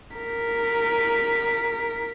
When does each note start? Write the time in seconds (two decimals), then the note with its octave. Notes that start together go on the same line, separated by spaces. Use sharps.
0.17 A#4 B6